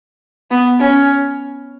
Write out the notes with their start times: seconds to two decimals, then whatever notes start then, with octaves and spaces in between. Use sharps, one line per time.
0.51 B3
0.80 C#4